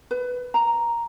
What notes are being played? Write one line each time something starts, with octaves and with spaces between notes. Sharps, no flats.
B4
A#5